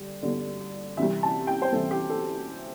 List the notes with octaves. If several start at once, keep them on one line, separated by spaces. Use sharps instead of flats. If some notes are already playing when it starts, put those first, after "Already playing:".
Already playing: G2 D3
G1 G2 D3
C2 C3 E3 E5
A5
G5
C5
C2 C3 E3 A4
G4
A4